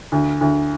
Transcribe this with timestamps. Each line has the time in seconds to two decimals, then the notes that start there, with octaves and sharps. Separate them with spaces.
0.12 D2
0.41 D2